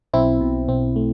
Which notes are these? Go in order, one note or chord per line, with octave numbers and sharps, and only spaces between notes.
B1 C4 E4
B2
B1 C4
A3